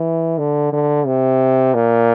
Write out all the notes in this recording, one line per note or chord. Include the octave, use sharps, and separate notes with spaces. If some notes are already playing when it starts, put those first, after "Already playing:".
Already playing: E3
D3
D3
C3
A#2